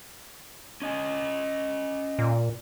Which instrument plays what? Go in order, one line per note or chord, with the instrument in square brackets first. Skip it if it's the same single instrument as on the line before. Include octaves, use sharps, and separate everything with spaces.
[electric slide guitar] C#4 D#5 G#5
[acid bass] A#2